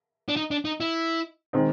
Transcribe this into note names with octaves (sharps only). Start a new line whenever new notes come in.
D4
D#4
D4
D#4
E4
D#3 G#3 C4 D#4